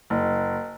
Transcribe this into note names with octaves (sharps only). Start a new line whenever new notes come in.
F#1